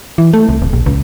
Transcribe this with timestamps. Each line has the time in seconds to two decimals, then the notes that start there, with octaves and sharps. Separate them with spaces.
0.18 E3
0.33 A3
0.49 C2
0.62 D1
0.73 A#1
0.86 C#2